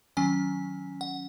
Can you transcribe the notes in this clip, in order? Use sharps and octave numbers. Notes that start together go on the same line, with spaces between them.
D#3 F#3 C#4 G#5
F#5